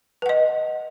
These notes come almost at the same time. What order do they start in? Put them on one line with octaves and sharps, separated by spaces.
B4 F#5 D#5